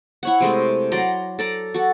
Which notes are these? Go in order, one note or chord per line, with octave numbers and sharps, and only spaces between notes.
E4 C#5 F#5
C3 G#3 A3
F#3 D5 A#5 C6
A4 D5 A#5
F#4 A4